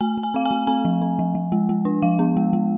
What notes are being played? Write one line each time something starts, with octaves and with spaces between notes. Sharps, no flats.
A3 G#5
A3
G#5
C4 F5
G#5
A3
C4 G#5
F3
C4
F3
F3
G#3
G#3
D4
F3 F5
B3
G#3
G#3